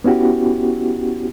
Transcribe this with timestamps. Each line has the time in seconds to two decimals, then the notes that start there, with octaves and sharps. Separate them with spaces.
0.04 B3 C#4 E4 F#4 G4